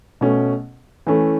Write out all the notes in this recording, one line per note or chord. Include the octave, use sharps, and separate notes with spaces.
B2 A3 C#4
E3 A3 C#4